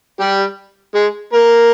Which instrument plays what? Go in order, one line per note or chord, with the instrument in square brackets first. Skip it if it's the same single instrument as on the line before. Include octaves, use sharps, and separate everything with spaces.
[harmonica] G3 G4
G#3 G#4
A#3 A#4